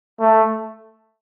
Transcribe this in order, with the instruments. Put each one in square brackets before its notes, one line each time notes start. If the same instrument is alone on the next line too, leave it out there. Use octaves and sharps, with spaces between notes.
[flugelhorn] A3